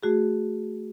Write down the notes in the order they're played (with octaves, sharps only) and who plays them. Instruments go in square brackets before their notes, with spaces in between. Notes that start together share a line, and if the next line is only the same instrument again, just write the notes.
[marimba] A3 F#4 G#4